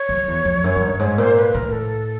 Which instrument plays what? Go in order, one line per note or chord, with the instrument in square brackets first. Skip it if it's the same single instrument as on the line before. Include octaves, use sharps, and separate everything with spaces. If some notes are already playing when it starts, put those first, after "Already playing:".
Already playing: [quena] C#5
[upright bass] F#2
E2
F2
F#2
G#2
G2
G#2
[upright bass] A#2 [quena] C5
[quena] B4
[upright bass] A2 [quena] A#4
[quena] A4